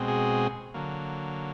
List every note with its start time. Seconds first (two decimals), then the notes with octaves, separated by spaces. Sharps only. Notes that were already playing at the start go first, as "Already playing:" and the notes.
Already playing: B2 G#3 C4
0.08 F#4 G#4
0.74 D3 F#3 A#3